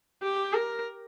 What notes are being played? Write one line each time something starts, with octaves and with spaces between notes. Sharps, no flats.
G4
A#4